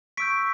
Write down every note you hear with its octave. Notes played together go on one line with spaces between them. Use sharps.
C#6 E6 G6 B6 D7